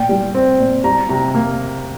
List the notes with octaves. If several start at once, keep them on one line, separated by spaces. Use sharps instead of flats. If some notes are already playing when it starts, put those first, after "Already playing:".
Already playing: A#2 G5
G3
C4
A#2
G3 A#5
C3 A#5
A#3